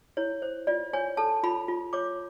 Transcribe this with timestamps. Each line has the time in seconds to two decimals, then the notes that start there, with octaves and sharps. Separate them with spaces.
0.17 E4 C#5
0.42 C5
0.67 F4 D5
0.93 C#5 G#5
1.17 A4 A5
1.44 F4 B5
1.68 F4
1.93 C#5 D6